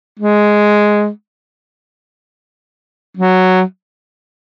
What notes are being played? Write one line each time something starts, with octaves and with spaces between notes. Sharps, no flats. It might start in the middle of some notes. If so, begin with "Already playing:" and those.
G#3
F#3